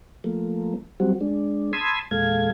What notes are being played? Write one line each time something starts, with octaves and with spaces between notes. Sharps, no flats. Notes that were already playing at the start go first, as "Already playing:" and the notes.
F3 A3 A#3
F#3 G3 C4 F#4
G#3 D4
A5 B5 C6 D#6 E6 G#6
E2 A#2 G#3 A4 F5 G#6